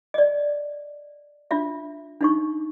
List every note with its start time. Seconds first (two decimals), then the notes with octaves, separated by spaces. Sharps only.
0.14 D5 D#5
1.51 D4 F4 E5
2.21 D4 D#4 C#6